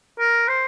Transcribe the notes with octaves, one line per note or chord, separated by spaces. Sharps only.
A#4
C5